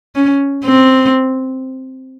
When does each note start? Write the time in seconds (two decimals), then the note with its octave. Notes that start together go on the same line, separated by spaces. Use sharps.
0.15 C#4
0.65 C4